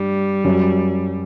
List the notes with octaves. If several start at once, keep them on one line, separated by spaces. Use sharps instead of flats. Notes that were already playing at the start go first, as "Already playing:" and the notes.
Already playing: G2 G3
F#2 F#3